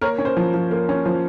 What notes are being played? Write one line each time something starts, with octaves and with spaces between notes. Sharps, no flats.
A#3 A#4 C#5
C#4
C5
F3
F3
A#3
C#4
F3 C5